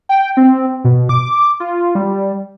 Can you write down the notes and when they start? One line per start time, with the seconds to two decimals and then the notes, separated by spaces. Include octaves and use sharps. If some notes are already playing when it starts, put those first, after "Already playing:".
0.09 G5
0.37 C4
0.84 B2
1.09 D6
1.60 F4
1.95 G3